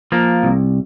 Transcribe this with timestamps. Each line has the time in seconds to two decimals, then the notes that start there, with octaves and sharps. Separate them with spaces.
0.12 F3 A#3
0.43 C2